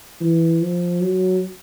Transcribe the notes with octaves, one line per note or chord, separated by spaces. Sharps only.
E3
F3
F#3